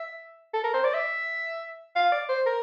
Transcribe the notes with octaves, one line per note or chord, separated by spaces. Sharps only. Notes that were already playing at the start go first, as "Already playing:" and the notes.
Already playing: E5
A4
A#4
C5
D5
E5
F5
D5
C5
A#4